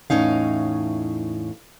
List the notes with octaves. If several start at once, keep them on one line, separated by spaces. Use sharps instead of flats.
E2 A2 C3 C#4 D#4 F5